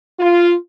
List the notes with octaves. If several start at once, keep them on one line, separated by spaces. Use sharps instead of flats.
F4